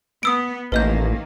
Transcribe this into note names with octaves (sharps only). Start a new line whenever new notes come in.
B3 D#6 E6 D7
A1 D#3 A3 A#3 B4 D#5 G6